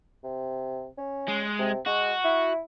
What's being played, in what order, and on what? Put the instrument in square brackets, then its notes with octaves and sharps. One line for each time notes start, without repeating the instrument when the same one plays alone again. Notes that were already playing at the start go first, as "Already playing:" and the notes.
[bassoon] C3
C#4
[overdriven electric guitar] G#3
[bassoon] C3
[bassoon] G#3 [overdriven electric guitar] F#4
[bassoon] E4